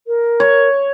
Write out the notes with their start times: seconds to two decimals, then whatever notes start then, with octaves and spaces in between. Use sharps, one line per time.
0.07 A#4
0.40 C#5